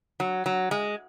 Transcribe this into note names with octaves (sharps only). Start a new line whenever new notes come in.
F#3
F#3
G#3